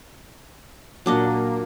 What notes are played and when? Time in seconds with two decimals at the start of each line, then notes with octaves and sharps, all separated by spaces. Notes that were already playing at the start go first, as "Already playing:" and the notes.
1.06 A#2 F#3 A#3 D4 D#5